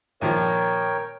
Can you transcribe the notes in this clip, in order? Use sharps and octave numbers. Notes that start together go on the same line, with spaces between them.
A#1 D#3 F3 A#4 C#5 G5